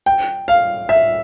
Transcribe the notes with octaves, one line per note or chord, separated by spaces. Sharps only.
G5
F5
E5